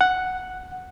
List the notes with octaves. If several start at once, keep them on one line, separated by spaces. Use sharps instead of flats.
F#5